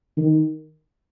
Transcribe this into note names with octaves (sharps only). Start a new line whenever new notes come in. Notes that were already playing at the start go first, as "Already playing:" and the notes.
D#3